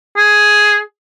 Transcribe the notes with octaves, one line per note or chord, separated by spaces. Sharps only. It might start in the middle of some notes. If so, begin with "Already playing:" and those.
G#4